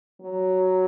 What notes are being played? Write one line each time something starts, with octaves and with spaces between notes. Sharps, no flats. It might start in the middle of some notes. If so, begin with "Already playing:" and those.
F#3